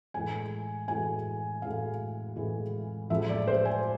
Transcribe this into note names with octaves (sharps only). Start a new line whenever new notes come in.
A2 E3 G#3 G#5
A2 E3 G#3 G#5
A2 E3 G#3 F5
A2 E3 G#3
A2 F3 G#3 E5
D5
C5
G#5